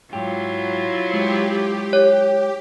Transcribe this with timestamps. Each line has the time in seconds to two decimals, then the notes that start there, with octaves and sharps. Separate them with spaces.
0.13 G#2 F#3 E4 F4 G4
1.09 G#3 G4 C5
1.93 C#5